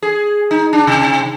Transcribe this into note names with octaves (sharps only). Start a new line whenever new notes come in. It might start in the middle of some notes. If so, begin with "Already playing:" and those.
G#4
D#4
D4
C3